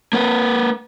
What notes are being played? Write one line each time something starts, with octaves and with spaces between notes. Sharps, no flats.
A#3 B4